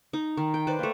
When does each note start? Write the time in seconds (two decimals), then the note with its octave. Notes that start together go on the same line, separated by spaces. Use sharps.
0.13 D#4 A#5
0.37 D#3
0.54 G5
0.67 B4 C5 D5
0.79 A3 A#3